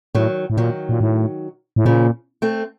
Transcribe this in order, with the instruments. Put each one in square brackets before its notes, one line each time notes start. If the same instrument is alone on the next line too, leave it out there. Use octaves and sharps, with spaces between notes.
[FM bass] A2 [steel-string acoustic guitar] D#3 F#3
[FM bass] A2
[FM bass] A#2 [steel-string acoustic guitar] D#3 F#3
[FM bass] A#2
A2
A2
[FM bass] A#2 [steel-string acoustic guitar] C#3 F3
[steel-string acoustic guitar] A3 C4